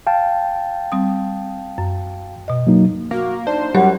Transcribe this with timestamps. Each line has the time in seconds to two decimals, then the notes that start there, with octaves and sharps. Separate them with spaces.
0.07 F5 G5 A5
0.92 G3 C4 D#6
1.78 F#2
2.48 B2 D#5
2.67 F#3 A#3 D#4
3.11 A#3 F#4
3.47 D4 D#4 C5
3.75 F#2 F#3 G3 G4 F#5